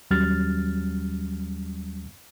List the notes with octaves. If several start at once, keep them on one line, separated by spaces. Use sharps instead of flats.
D#2 F#3 G3 C#4 F6 A6